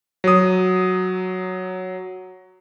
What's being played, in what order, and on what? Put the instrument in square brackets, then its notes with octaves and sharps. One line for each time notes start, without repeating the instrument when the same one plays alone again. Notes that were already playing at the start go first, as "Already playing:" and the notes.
[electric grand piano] F#3 D#6